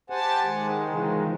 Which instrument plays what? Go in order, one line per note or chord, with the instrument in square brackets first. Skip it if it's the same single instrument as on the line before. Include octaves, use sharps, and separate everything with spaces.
[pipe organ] G4 A5 [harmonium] C5 F#5 G#5
[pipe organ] D#3 G#3
[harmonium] C#3 E3 F3